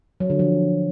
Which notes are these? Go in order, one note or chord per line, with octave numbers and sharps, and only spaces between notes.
F#3
D3
F3